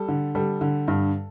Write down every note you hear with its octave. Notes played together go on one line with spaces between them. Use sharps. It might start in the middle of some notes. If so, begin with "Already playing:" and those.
Already playing: G3 A4
D3
G3 A4
D3
G2